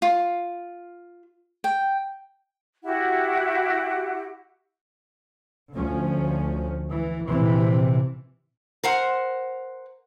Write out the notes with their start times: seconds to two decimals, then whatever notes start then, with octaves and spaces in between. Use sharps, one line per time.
0.02 F4
1.64 G5
2.83 E4 F#4 G4 F#5
5.73 D2 F3 C#4
6.90 E3
7.27 A#1 C3 E3
8.84 A#4 C5 F#5